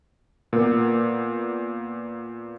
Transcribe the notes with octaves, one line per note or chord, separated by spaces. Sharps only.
A#2 A#3 B3